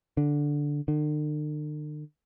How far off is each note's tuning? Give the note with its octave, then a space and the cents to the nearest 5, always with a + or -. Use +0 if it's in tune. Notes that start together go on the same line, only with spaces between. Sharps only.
D3 -5
D3 +45